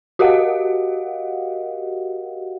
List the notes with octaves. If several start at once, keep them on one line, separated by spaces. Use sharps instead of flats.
F#4 G4 A#4 D#5 F5 F#5